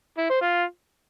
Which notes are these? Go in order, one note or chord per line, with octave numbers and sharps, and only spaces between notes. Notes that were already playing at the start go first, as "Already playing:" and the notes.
E4
C5
F4